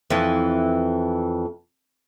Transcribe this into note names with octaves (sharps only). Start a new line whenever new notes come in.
F2 E3